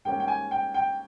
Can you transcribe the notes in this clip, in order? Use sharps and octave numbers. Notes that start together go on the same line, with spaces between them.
G#2 G3 A#3 C#4 G5
G5
G#5
G5
G5